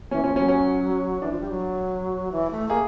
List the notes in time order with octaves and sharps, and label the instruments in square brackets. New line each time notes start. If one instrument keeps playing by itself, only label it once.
[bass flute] E3 [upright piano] C#4
[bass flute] F3 [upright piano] C#4
[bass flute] F#3 [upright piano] C#4
[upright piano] C#4
[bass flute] E3 [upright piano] D4
[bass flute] F3
G3
F#3
E3
A3
[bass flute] A#3 [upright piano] G#4